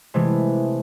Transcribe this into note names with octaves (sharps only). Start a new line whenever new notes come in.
C3 E3 G#3 A3